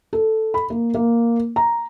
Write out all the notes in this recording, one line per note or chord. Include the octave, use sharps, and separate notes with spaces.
A4
B5
A#3
A#3
A#5